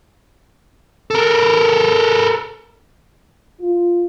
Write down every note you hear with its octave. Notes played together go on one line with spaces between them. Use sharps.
A4 A#4
F4